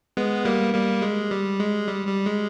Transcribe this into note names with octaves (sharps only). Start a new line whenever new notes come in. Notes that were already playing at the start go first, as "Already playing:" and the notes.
G#3 B3
G3 A#3
G3 A#3
G#3
G3
G#3
G3
G3
G#3